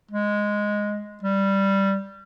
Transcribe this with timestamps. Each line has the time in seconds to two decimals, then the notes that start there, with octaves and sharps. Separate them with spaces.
0.11 G#3
1.23 G3